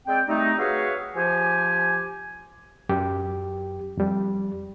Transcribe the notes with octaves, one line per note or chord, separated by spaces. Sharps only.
G#3 C4 D5 G5
G3 A3 C4 D#4
F#4 G#4 B4 C#5 E5 F5
F3 G4 G#5
F#2 G4
F2 G3